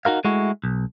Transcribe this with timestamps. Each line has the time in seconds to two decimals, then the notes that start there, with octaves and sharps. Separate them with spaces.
0.05 D#4 F#4 A#4 F5
0.25 G#3 A3 E4 F#4
0.64 B1